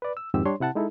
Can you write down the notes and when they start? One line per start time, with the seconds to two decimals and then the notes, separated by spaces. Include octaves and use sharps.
0.02 B4 D5
0.17 E6
0.34 F2 G#2 D#3 C4 G4 E6
0.46 G3 D4 C#5 C6
0.60 C3 E4 F#5 A5
0.75 G#3 D#4 E4 A4